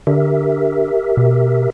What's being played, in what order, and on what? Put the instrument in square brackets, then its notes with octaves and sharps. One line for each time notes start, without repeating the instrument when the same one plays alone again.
[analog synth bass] D3 [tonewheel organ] G4 A#4 E5
[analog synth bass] B2